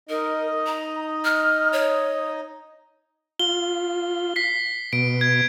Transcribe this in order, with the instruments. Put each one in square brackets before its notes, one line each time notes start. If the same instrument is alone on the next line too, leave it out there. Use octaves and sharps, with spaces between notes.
[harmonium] D#4 D#5 [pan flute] A#4
[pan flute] A#5
F6
C#5
[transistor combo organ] F4 [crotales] G7
[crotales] B6 C7
[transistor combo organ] B2 [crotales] D7
[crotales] G#6